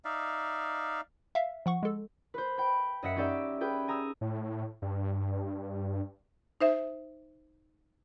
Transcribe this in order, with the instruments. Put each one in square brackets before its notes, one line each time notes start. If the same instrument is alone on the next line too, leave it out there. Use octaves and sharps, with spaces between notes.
[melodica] D#4 D5 E5 F5
[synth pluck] E5 F5
F3 F#5 C#6
G#3 A4
[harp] B4 C5
G5 B5
F#2 D#5 E5 F#5 B6 C#7
C#4 D#4 G4 D5 E5 G5
G4 G#4 B4 G5
G#5 A#5 D#6 E6
[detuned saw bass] A2
G2
[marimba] D#4 C5 E5